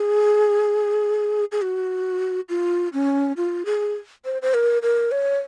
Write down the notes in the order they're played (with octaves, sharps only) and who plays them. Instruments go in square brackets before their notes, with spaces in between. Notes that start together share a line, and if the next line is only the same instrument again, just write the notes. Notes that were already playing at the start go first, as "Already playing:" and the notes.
Already playing: [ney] G#4
G#4
F#4
F4
C#4
F4
G#4
C5
C5
A#4
A#4
C#5